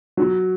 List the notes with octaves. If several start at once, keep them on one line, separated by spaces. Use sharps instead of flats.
F#3